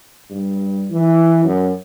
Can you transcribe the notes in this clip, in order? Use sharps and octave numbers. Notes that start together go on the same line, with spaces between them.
G2
E3
F#2